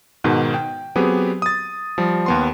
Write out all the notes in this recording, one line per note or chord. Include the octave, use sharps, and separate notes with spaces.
G#2 B2 D#3
G5
F#3 B3 C4 G4 G#4 B4
D#6 A6
F3 G3
D#2 B3 C6